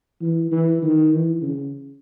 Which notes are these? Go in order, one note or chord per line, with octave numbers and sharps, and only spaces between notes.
E3
E3
D#3
E3
C#3